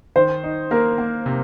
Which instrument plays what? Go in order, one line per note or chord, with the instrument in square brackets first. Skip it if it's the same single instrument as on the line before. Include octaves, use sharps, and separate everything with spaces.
[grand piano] D#3 [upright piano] C5
[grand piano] D#4
[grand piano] A#3 [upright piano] A#4
[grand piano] A#3
C3